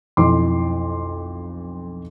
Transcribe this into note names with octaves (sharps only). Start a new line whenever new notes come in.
B1 F2 E4 C6 D6